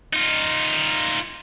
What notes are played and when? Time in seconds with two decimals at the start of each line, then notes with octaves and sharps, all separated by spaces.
0.13 D#4 F4